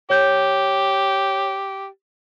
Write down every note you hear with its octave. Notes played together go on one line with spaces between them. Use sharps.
G4 C#5 G6